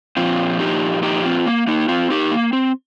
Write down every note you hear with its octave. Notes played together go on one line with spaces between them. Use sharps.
A#2 F3 C4 F4
D#4 G4
D#4 G4
C4 F4
A#3
A#3 D#4
C4 F4
D#4 G4
A#3
C4